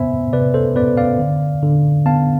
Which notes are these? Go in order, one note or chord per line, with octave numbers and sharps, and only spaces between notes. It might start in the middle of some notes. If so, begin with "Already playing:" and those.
Already playing: C3 B3 C5 E5 G#5 B5
C3 B4 D5
A4 C5
B3 B4 D5
D5 F5
D3
D3
B3 F5 A5